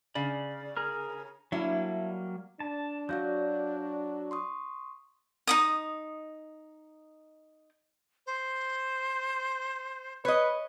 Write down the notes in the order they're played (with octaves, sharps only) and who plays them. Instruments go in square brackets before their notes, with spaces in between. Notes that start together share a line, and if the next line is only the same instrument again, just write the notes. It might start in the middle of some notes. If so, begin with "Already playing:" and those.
[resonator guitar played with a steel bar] C#3 [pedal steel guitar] D5
[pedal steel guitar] G#4 A#4 F6
[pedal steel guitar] F#3 G3 A#3 [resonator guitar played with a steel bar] D4 E4
[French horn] D4 [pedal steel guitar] A5
[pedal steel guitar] F#3 F#4 [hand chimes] D5 F5 G6
[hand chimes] C6 C#6 D#6
[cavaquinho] D#4 E4 D#6
[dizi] C5
[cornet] B4 [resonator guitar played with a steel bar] C#5 D#5